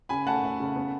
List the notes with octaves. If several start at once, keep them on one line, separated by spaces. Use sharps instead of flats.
C#3 G#5 B5
A3 F#5 A5
A3
C#3
B3